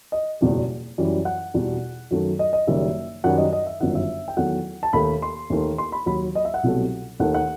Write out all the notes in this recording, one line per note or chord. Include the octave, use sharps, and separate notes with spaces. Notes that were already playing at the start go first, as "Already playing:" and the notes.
D#5
F#1 E2 B2 G3
F#2 E3 G3
F#5
E2 B2 G3
F#2 D#3 F#3 A3
D#5
D#5
F#1 F#2 D#3 G3 E5
F#2 D#3 G3 F#5
D#5
D#5
E5
G1 F#2 D#3 G3 F#5
E5
G5
E2 D#3 F#3 A3 F#5
A5
D#2 D#3 A3 B5
C6
D#2 D#3 A3
C6
B5
D#2 D#3 F#3 B5
D#5
E5
F#5
C2 B2 F#3 A3
D#2 D#3 A3 F#5
F#5